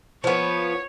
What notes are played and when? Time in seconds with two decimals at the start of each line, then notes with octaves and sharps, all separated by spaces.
0.24 F3 B3 C#5